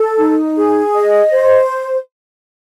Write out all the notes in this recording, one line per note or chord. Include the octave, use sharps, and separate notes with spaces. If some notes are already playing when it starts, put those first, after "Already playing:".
Already playing: A4
D#4
G#4
D#5
C5